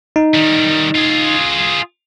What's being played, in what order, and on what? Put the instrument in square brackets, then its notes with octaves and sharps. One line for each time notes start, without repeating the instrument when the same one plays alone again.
[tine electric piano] D#4
[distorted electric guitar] D#3 G3
F4 G#4